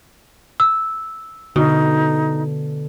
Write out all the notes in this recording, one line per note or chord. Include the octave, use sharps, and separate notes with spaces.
E6
B2 D3 D#4